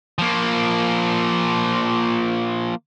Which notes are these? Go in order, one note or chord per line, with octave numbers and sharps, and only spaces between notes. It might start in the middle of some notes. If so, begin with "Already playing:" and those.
F3 A#3